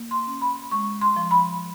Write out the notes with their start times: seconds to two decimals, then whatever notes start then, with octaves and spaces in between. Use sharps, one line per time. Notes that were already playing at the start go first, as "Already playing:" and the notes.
Already playing: A#3
0.11 C6
0.27 C#4
0.41 B5
0.71 G#3 C#6
1.01 C6
1.16 F3
1.31 B5